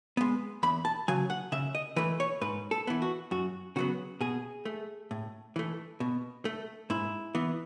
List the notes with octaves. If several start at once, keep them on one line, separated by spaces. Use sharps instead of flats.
G#3 B3
E2 B5
A5
C#3 F#3 G#5
F#5
C#3 E5
D#5
E3 A3 B4
C#5
G#2 B4
A4
E3 B3
F#4
F#2 F#4
C#3 F#3 B3 F#4
B2 G#4
A3
A2
E3 A3
B2
A3
G#2 E4
E3 B3